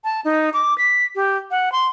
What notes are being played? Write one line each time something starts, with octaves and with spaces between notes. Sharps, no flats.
A5
D#4
D6
B6
G4
F#5
C6